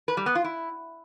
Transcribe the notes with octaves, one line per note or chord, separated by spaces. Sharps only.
B4
G3
B3
F4
E4